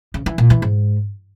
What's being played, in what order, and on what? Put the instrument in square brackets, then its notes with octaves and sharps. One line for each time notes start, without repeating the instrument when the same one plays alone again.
[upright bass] C#3
E3
A#2
E3
G#2